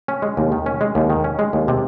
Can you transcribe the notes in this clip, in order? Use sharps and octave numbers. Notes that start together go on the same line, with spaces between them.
C#4
G#3
D#2
D#3
C#4
G#3
D#2
D#3
C#4
G#3
D#2
C3